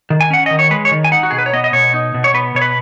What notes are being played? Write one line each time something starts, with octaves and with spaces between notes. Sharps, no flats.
D#3
G#5
C#4 F#5
D#3 D#5
C#5
G#3 B4
C#5
D#3
G#5
D#4 F#5
F#4
B2 G#4
B4
C#5
B3 D#5
D#5
B2 C#5
D#4
B2
C#5
B3 B4
B2 C#5
B4